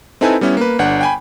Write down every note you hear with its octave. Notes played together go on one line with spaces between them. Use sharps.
C4 D#4 E4 A4 B4 G#5
G3 B3 C#4 E4
A#3 B4
G1 D4 F#5
G5 G#5 B5